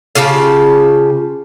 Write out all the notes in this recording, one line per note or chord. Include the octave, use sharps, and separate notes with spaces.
C#3 F4 G4 A5